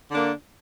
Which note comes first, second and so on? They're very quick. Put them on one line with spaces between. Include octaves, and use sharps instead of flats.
D3 D4 A#3